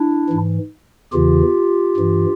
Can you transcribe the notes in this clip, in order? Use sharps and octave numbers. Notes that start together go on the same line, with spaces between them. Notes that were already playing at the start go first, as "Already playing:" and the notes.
Already playing: D4 E4
G#2 E3
E2 C#3 E3 F4 G4
G2 E3